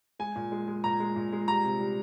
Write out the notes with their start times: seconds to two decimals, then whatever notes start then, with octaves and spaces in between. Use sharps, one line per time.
0.19 G#3 G#5
0.36 A#2
0.52 G#3
0.68 G#3
0.84 A#2 A#5
1.00 G#3
1.16 A#2
1.33 G#3
1.48 G3 A#5
1.64 C3
1.80 G3